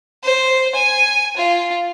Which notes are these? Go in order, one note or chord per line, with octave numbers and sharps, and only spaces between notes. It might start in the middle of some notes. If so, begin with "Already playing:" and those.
C5
G#5
F4